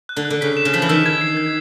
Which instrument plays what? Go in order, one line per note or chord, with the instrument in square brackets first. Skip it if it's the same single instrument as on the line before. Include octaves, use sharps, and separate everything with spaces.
[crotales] F#6
[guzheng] D3
[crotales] F#6
[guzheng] D3
[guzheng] C#3 [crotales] B6
[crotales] E7
[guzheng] C#3
[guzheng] F3 [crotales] B6
[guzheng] E3
[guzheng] D#3 [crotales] E6
[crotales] G#6
C7
G#6